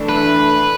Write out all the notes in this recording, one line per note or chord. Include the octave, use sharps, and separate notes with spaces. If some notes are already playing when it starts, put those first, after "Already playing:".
Already playing: E3 A3 D4
B4